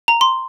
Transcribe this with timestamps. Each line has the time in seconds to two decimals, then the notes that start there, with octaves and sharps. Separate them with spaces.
0.08 A#5
0.21 C6